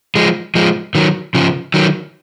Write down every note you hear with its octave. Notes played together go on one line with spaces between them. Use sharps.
F3 G#3
F3 G#3
D#3 F#3
C#3 F3
D#3 F#3